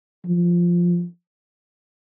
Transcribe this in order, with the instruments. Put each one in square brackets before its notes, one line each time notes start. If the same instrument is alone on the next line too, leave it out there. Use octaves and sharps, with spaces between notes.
[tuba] F3